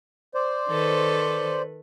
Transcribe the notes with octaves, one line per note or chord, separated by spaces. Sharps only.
C5 D5
D#3 A4 B4